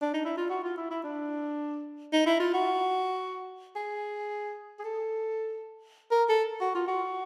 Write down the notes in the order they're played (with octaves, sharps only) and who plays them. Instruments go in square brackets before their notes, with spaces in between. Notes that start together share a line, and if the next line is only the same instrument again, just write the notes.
[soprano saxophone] D4
D#4
E4
F4
F#4
F4
E4
E4
D4
D#4
E4
F4
F#4
G#4
G#4
A4
A#4
A4
F#4
F4
F#4